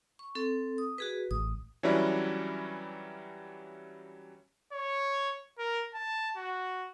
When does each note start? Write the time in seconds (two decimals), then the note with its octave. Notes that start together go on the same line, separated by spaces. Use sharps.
0.19 C#6
0.35 C4 A4
0.78 D#6
0.98 F#4 G#4 B4
1.31 A1 D#6
1.83 E3 F#3 G3 C#4 D4 E4
4.73 C#5
5.58 A#4
5.94 A5
6.37 F#4